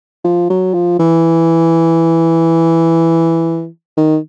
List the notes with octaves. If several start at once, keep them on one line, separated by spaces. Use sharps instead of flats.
F3
F#3
F3
E3
D#3